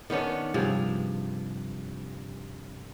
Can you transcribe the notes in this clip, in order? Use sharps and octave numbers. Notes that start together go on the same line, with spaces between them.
D#3 B3 C#4 D4
G2 C3 F3 G#4